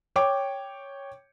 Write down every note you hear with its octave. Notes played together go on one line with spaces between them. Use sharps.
C#5 G5 D6